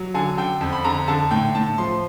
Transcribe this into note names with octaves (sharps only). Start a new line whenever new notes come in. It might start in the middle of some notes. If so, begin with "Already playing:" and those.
Already playing: F#3
D3 G#5
D3 G5
F2
B5
D3 A#5
D3 A5
A2 G5
A2 A5
F3 C6